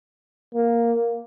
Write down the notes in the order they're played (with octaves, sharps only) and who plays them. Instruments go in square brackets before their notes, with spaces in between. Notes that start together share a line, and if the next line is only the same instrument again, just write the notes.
[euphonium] A#3